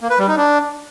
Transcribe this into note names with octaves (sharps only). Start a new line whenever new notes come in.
A#3
B4
G3
D#4
D4